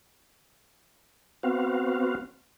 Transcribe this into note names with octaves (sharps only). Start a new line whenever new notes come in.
B3 C4 F#4 F5